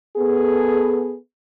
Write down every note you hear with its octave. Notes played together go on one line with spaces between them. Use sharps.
B3 G#4 A4